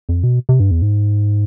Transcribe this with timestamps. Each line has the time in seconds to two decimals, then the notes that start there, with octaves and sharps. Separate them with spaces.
0.09 F2
0.24 B2
0.49 C3
0.60 G2
0.71 E2
0.82 G#2